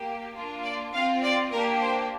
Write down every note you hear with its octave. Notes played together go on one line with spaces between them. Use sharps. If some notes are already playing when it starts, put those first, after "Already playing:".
Already playing: A#3 G4
A#3 D4 F4
D5
C4 F4 F5
D5
A#3 D4 G4 A#4
C5